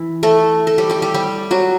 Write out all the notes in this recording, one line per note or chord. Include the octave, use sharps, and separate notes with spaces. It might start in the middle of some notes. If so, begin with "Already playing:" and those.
Already playing: E3 E4
A3 A4
A4
G3 G4
G3 G4
G3 G4
G3 G4
F#3 F#4